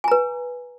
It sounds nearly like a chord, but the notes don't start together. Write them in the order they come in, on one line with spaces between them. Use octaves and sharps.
G#5 A#5 B4